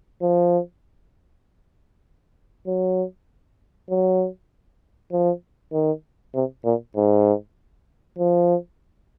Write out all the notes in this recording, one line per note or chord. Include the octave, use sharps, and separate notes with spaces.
F3
F#3
F#3
F3
D#3
C3
A#2
G#2
F3